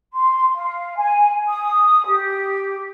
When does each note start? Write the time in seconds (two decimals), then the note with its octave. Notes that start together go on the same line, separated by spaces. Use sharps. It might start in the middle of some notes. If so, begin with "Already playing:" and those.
0.13 C6
0.54 F5
0.95 G#5
1.46 D#6
2.06 G4